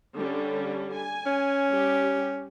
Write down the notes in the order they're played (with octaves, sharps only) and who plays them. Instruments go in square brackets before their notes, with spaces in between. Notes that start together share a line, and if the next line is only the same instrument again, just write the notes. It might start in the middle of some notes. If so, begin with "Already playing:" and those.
[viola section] D3 G3 C#4
G#5
[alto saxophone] C#4
[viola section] G3 G4